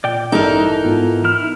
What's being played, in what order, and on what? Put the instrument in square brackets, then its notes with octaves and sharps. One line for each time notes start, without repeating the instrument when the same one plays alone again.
[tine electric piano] A#2 [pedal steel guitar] D5 G5
[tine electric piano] A1 G2 [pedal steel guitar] E3 A4 [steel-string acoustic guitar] D#4 A#4
[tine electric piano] G#2 B3 F4
[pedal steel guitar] E4 F6